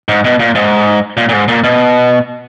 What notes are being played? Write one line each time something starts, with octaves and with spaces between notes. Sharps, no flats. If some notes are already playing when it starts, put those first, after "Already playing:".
G#2
B2
A#2
G#2
A#2
A#2
G#2
A#2
B2